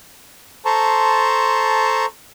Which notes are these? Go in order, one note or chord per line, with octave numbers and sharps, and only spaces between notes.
A4 C5 A5 A#5 C6 C#6